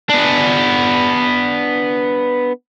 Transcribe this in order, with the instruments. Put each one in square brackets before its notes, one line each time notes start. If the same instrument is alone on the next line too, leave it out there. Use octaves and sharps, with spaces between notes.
[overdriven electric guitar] B3 D4